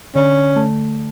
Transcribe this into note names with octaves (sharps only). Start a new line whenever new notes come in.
D3 C#4
A3